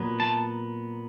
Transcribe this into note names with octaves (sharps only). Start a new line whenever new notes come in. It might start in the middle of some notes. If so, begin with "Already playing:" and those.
Already playing: A#2 F#3 B3
A5